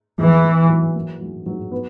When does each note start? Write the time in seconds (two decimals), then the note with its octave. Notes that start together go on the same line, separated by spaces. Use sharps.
0.18 E2 E3
0.45 E2
0.69 F#3
0.95 A#3
1.21 F#3
1.46 F#3
1.72 B3